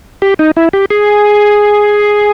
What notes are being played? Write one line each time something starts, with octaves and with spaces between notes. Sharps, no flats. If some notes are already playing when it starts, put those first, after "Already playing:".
G4
D#4
E4
G4
G#4